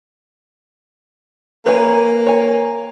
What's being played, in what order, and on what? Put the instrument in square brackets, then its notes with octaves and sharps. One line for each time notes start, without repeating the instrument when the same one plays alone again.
[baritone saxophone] A#3 [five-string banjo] B4 C#5 G#5
[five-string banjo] C#5 G#5